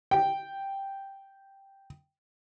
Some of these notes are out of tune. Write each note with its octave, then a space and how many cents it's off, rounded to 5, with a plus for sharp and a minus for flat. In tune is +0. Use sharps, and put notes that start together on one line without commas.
G5 +0